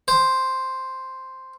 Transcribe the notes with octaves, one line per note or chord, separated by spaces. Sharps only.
C5